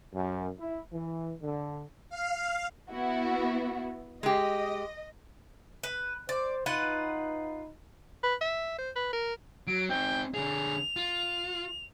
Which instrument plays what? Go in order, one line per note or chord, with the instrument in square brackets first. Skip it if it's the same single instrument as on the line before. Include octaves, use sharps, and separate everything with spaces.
[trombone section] F#2
E4
E3
D3
[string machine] F5
[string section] B3 E4 F#4
[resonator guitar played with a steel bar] G#3 G4 [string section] D#5
[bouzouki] B4
[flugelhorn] C5 [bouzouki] D5
[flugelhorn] D#4 [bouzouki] F4 B4 F#5
[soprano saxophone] B4
E5
C5
B4
A#4
[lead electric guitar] F#3 [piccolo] D7
[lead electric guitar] C4 D#4 [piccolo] G5
[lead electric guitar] D3 G#4 [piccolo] F7
[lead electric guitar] F4